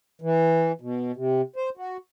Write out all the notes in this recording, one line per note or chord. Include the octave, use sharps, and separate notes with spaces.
E3
B2
C3
C5
F#4